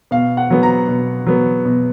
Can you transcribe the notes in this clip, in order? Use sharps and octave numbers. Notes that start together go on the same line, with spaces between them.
B2 F5
F#5
F#3 B3
A#5
B2
F#3 B3
B2